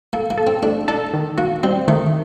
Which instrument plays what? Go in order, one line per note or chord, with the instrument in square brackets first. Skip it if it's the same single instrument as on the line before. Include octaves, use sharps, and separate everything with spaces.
[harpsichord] A#3 [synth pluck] A4
[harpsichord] A#3
[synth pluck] A4
[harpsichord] C4
[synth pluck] A3 [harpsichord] D4
[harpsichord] D4 [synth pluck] A4
[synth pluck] D#3
[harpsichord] A#3 [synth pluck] F#4
[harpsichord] G3 [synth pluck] C4
[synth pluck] D#3 [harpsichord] A3